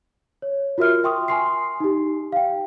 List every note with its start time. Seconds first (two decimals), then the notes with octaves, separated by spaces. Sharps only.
0.42 C#5
0.78 F4 F#4 A#4 E5 F6
1.04 E5 G5 C6 C#6 D#6
1.28 G#5 C6 C7
1.80 D#4 G4
2.32 F5 G5